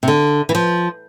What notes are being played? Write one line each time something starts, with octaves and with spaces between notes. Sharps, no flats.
C3
D3
E3
F3